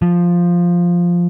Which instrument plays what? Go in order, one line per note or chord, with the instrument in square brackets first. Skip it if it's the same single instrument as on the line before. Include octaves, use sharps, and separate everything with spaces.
[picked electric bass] F3